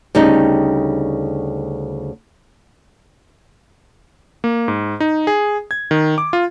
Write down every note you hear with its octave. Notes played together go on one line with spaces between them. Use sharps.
D2 C#3 G3 D#4
A#3
G#2
D#4
G#4
G#6
D#3
D6
F4